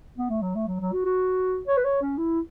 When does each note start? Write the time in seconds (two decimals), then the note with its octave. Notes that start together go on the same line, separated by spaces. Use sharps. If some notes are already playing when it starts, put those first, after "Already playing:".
0.18 B3
0.29 A3
0.42 F#3
0.55 A3
0.67 F#3
0.80 F#3
0.93 F#4
1.05 F#4
1.67 C#5
1.77 B4
1.84 C#5
2.02 C#4
2.17 E4